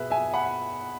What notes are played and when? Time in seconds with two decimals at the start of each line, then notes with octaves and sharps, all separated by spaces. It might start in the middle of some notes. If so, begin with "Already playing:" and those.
Already playing: B2 B3 G#4 B4 E5
0.10 E5 G#5
0.33 F#5 B5